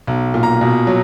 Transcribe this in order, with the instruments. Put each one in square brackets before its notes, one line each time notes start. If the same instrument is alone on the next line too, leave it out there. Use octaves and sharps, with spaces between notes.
[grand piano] B1
A#2
A#5
B2
F#3